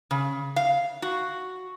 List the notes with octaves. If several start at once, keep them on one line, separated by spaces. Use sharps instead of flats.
C#3
F5
F#4